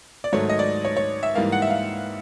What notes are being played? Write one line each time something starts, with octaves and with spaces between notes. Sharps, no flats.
D5
G#2 D#3 F#3 A3 C#5
D#5
D5
C#5
C#5
E5
G#2 E3 G3 A#3 F5
F#5
E5
F5